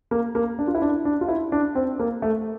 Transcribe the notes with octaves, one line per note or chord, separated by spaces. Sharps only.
A#3
A#3
D4
F4
E4
D4
D4
F4
E4
D4
C4
A#3
A3